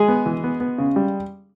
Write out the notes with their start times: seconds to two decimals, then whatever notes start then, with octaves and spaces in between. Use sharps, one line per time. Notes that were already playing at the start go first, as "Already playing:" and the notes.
Already playing: G#3 G#4
0.08 B3
0.26 E3
0.44 B3
0.60 B3
0.78 C#3
0.96 G3